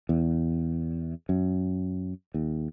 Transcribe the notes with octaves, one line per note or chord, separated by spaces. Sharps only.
E2
F#2
D#2